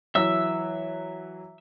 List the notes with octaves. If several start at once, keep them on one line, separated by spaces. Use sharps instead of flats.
E3 F#3 E5 E6